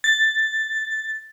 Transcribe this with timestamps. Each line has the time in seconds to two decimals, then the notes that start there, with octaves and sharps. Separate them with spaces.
0.04 A6